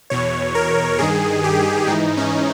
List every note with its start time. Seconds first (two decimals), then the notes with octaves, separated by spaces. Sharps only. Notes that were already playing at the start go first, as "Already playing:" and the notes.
0.10 E2 B2 C#5
0.55 A#4
0.99 G2 D#3 G#4
1.44 G4
1.87 G#2 E3 D#4
2.17 C#4